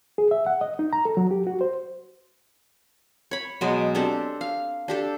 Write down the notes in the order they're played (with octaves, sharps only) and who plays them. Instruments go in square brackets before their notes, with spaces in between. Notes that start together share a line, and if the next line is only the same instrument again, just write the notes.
[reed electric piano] G#4
E5
F#5
D#5
D#4
A#5
A4
F#3
G4
F#4
C5
[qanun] C#5 B5
B2 F#3 G#3
C4 D4 G4 A4
F5
D4 G4 A4